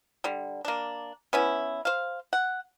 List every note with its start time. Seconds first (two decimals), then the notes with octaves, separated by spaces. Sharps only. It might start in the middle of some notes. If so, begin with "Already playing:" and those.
0.24 D3 G3
0.65 A#3 D4
1.33 B3 C#4 E4
1.85 C5 F5
2.33 F#5